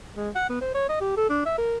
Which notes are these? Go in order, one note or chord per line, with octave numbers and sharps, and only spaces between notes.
G#3
F#5
B3
C5
C#5
D#5
G4
A4
D4
E5
A#4